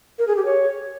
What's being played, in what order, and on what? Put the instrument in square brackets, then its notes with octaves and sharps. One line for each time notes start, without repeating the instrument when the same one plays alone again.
[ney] A#4
G#4
G4
C#5